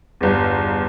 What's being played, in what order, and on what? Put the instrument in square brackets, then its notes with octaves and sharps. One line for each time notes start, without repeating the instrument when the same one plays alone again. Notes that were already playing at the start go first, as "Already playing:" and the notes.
[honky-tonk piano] G1 E2